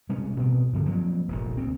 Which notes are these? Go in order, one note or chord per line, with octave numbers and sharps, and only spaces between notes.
C3 G3 G#3 C#4
A1 B2 B3 C4
G2 D3 F3
F3 F#3 A#3 C4
F1 A#1 G2
D2 C4